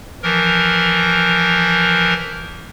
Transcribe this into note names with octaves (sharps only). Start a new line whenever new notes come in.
E3 F3 A#4